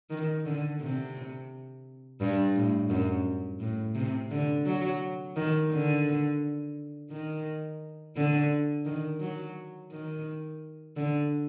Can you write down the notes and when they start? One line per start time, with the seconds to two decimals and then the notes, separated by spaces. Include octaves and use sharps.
0.10 D#3
0.45 D3
0.81 C3
2.21 G2
2.56 A2
2.90 F#2
3.60 A2
3.95 C3
4.31 D3
4.66 F#3
5.36 D#3
5.71 D3
7.11 D#3
8.16 D3
8.85 D#3
9.20 F#3
9.92 D#3
10.97 D3